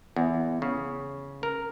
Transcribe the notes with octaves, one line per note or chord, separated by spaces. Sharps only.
E2
C#3
A#4